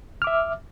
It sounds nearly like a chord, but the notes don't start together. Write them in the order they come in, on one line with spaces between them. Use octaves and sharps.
F6 D6 E5